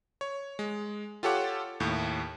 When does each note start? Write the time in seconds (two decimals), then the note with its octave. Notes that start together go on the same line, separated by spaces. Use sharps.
0.21 C#5
0.59 G#3
1.23 F4 G4 A4 C#5 F#5 D6
1.80 D#2 A2